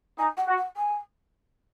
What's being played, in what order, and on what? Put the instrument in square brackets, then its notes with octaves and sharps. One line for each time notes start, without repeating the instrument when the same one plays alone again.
[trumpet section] D#4 [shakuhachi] G#5
[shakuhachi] F#5
[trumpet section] F#4
[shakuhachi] F#5
G#5